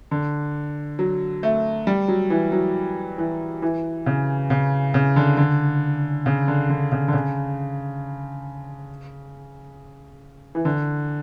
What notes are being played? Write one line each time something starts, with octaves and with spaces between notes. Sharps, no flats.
D3
F#3
A3
G3
F#3
E3
F#3
E3
E3
C#3
C#3
C#3
D3
D3
C#3
D3
D3
C#3
D3
C#3
E3
D3